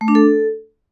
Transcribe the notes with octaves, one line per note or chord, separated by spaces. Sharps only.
A3
D4
A4